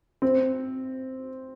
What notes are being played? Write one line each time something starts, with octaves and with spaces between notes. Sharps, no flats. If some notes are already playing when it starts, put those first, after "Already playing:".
C4